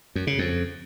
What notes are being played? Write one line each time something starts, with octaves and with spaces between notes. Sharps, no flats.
F#2
C#3
F2